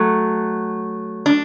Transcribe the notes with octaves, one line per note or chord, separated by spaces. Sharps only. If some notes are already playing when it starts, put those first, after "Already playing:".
Already playing: F#3 A3
D4